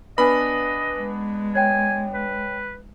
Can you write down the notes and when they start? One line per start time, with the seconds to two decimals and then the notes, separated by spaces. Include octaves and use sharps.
0.18 B3 D4 B4 D#5 G#5 B5
0.98 G#3
1.55 C#5 G5 G#5
2.14 B4